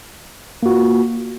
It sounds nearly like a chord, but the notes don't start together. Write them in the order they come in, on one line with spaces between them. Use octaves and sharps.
A#3 F#4 F4